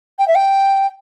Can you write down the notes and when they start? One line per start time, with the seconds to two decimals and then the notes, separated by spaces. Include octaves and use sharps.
0.19 G5
0.28 E5
0.35 G5